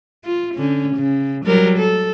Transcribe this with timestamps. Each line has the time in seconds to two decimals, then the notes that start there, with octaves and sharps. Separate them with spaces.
0.24 F4
0.54 D3 C#4
0.96 C#3
1.45 F#3 G3 A#4
1.78 A4